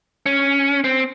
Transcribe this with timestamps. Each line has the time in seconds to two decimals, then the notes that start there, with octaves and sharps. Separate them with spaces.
0.26 C#4
0.84 C4